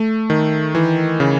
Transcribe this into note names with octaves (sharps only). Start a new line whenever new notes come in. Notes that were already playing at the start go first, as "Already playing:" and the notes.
Already playing: A3
D#3
E3
C#3